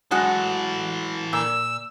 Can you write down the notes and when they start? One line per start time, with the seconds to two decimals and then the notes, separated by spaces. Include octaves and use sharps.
0.11 E3 F#3 G#3 F#4 A4
1.33 A#2 E6